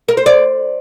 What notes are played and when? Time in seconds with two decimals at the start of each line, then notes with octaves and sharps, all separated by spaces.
0.08 A#4
0.17 C5
0.26 D5